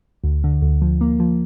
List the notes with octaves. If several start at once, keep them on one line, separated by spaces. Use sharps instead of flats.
D2
D3
D2
F3
A#3
F3